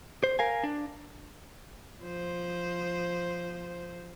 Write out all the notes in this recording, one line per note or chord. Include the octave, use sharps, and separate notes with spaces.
C5
A#4 F5 G#5
D4
F3 C5